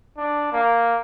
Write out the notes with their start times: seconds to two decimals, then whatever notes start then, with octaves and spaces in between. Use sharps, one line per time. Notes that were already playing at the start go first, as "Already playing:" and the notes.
0.17 D4
0.52 A#3